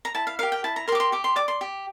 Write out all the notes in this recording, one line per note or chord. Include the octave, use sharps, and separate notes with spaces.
A#5
E4 A5
F5
G4 A#4 F5
G5
E4 A5
A#5
G4 A#4 C6 D6
C6
G4 D6
C6
D5 D6
C6
G4